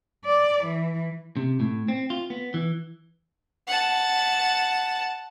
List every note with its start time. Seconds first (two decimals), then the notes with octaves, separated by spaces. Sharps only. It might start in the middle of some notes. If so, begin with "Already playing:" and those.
0.25 D5
0.64 E3
1.37 C3
1.60 A2
1.88 C4
2.10 F4
2.30 B3
2.54 E3
3.67 F#5 A5